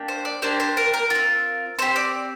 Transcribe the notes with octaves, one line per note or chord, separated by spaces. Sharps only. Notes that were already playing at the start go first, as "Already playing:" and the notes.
Already playing: A#3 D4 G4
C5
D5
A#3 D4 G4 C5
C5
A#4
A#4
C4 F4
C4 G4 C5
D5